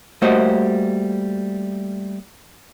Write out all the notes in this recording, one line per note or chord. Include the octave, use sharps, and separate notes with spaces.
G3 A3 A#3 F#4 C5 D#5